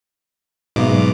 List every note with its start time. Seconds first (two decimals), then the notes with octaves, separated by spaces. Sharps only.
0.76 G#2 B2 F#3 G#3 D6 F7